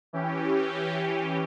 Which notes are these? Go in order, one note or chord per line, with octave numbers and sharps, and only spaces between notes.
E3 C#4 G4